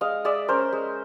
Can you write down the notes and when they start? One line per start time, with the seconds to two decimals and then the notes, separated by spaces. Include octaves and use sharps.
0.01 G#3 D#5 F5
0.25 G#3 D5 E5
0.48 C#4 A#4 C5
0.73 G#3